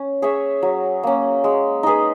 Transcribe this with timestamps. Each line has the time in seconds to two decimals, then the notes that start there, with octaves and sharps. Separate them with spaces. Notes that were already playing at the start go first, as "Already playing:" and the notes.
Already playing: C#4
0.22 G#4 C#5 E5
0.62 F#3
1.03 A#3 C#4
1.44 G#3
1.83 D#4 G#4 B4